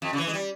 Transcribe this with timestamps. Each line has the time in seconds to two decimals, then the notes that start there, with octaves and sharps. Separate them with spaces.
0.02 F2
0.13 C#3
0.18 E3
0.27 G#3
0.34 G3